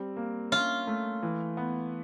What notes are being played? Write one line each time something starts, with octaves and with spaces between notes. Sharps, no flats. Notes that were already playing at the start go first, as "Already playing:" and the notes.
Already playing: G3 C4
A#3
C#4 F4
A3
E3
B3